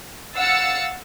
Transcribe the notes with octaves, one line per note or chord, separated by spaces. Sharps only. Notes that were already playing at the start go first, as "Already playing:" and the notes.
F5 F#5 E6 A6 C#7